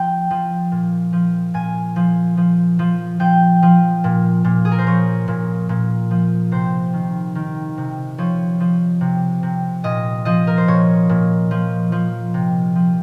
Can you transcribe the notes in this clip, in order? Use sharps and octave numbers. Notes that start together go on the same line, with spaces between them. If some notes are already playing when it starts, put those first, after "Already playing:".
Already playing: F3 G5
F3
A#2
F3
A#2 G#5
F3
F3
F3
F3 G5
F3
A#2
A#2
G#4
A#4
C5
F3 C#5
A#2
A#2
F3
C3 C5
D#3
D#3
C3
F3 C#5
F3
C3
C3
A#2 D#5
F3 D#5
A#4
C5
A#2 C#5
A#2
F3
F3
C3
F3